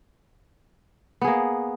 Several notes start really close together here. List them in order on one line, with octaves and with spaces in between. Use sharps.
B3 G#4 A#3